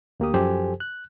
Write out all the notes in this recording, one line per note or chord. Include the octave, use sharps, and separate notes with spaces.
D2 A#3 G4 D#6
F#2 F3 G4 A4 C5 G#5
F#6